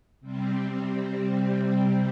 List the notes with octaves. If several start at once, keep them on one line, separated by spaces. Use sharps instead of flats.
C3 G3 C4